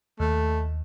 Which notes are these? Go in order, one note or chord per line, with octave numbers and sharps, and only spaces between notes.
D#2 A3